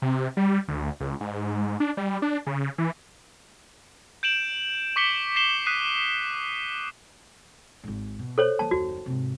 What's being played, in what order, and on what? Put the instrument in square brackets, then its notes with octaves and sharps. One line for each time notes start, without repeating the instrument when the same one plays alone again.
[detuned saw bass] C3
G3
D2
C#2
G#2
D4
G3
D4
C#3
E3
[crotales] G6 D7 E7 F#7
C#6 D6 B6 C#7 G7
B6 C7 E7 G7
D#6 F#6 B6 C7 D#7
[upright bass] G#1 G#2
B2
[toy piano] A4 C5 C#5
[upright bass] E3 A#3 [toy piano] A5
[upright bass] F#1 D#2 [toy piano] F#4
[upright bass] G#2 C3